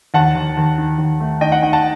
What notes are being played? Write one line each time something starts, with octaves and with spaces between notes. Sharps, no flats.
D#2 F#5 A5
D#2
D#2
D#3
D#2
A3
D#3 D#5 G5
F#5
D#3 G5
F#5 A5